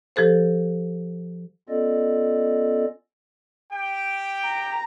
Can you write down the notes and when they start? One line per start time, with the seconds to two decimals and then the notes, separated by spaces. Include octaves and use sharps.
0.16 F3 G4 A4 C5
1.69 B3 C#4 F4 A4 D5 D#5
3.73 G4 G5
4.45 A#5